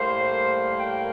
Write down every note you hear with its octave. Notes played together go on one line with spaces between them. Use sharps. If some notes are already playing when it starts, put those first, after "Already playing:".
Already playing: A2 G3 A#3 C5
G5